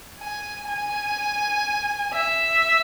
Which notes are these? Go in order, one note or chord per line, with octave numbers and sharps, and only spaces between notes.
G#5
G#5
E5